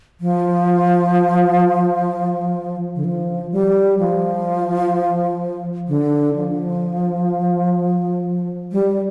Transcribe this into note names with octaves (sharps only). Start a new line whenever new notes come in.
F3
D3
F3
G3
F3
D3
F3
G3